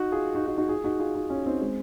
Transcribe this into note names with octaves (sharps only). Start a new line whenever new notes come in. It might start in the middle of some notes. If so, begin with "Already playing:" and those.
Already playing: D#4 F#4
F4 G#4
D#4 F#4
D#4 F#4
D#4 F#4
F4 G#4
D#4 F#4
F4 G#4
D#4 F#4
C#4 F4
C4 D#4
G#3 C4